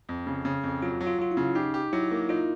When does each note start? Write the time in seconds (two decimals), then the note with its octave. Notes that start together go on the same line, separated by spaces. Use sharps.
0.09 F2
0.27 C#3
0.45 C#3
0.64 F2
0.82 F#3 F4
1.01 F#3
1.07 F4
1.19 F#3 F4
1.31 E4
1.37 C#3
1.55 D#4 G4
1.74 G4
1.93 F#3 E4
2.11 A#3
2.29 D#4 F4